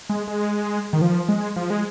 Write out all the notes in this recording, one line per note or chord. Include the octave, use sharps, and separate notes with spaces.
G#3
G#3
D#3
F3
G#3
F3
G#3